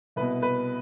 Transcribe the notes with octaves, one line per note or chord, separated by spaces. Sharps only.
C2 B2 B4
B4